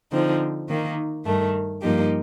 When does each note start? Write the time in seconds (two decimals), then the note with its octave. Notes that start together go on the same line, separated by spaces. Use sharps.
0.12 D3 F3 C4 D#4
0.68 D#3 A#3 D#4
1.25 G2 D#3 A3
1.81 G2 F3 A#3 D#4 G4